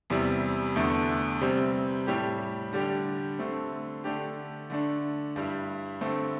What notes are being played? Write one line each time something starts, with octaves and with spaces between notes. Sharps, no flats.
E2 C3 G3 E4
E2 D3 A3
C3 G3 C4
A2 G3 E4 G4
D3 G3 D4 G4
D3 A3 C4
D3 A3 D4 G4
D3 A3 D4
G2 G3 E4
D3 A3 C4